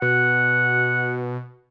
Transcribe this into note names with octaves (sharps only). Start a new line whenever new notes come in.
B2 F#5